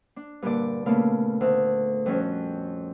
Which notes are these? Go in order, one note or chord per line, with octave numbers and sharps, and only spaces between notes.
D4
G2 A#2 D3 D5
A#2 C#3 A3 B3 A4 F5
D2
F2 G3 C#4 F#4